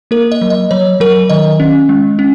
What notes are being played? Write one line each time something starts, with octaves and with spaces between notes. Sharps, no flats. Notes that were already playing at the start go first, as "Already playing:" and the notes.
A#3 A#4
D#5
F#3
D#5
F#3 C#5
F#3 A#4
D#3 D#5
C#4
G#3
C#4